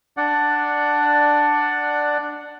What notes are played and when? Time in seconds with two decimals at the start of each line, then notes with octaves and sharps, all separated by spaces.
0.17 D4 D5 F#5